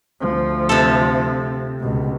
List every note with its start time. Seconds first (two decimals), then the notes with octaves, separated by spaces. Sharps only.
0.21 D2 F3
0.69 C3 A4
1.80 C#2 B2